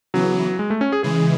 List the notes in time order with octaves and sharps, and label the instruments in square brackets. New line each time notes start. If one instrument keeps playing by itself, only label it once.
[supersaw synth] C#3 E3 B3 [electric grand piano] F#3
[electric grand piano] G#3
A3
C#4
G#4
[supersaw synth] C#3 E3 G#3 [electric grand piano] G#4